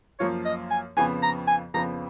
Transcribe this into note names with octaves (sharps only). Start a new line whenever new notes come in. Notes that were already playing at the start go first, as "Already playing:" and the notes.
F#2 F3 A#3 F4 C#5
D#5
G#5
F2 C#3 F3 B3 G#5
A#5
G#5
F2 C#3 F3 B3 A#5